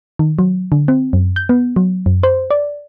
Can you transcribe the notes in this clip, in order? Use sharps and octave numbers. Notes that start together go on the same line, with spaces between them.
D#3
F#3
D3
C4
F#2
G6
B3
F#3
F#2
C5
D5